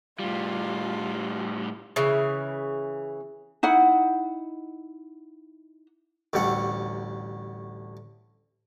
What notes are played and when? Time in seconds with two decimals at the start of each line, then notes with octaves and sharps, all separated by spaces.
0.19 A2 G3 F4
1.96 C#3 E3
3.63 D#4 E4 F#5
6.33 A1 D2 G3 A3 F#5